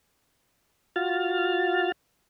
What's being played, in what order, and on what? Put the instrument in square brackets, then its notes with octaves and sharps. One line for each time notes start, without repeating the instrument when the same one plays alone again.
[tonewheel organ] F4 F#4 F6 A6